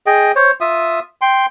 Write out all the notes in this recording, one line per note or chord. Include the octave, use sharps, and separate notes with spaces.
G#4 D#5 G5
C5 C#5
F4 E5 D#6
G5 C6